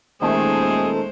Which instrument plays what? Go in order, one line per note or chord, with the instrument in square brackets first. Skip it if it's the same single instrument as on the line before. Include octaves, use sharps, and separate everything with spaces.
[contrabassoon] D#1 [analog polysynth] D#3 A3 [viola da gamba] G#3 C5 [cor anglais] G#4